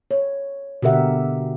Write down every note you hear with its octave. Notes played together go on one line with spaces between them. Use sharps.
C#5
B2 D3 G4 A#4 E5 F#5